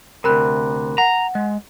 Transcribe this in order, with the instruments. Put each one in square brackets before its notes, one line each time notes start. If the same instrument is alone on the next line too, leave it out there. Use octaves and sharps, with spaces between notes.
[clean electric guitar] D2 C3 [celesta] A#4 B5 F#6
[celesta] F#5 [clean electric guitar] A#5
[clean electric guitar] G#3